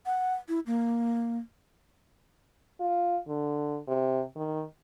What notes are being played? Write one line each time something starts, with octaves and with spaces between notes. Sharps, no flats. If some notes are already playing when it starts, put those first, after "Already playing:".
F#5
E4
A#3
F4
D3
C3
D#3